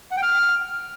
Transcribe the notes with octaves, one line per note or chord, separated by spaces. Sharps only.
F#5
G5
F6